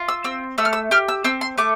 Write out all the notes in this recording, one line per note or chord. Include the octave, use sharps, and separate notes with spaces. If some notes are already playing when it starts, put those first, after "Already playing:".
Already playing: F4
E6
C4 E6
A3 E6
F6
E6
G4 F6
E6
C4 E6
C6
A3 D6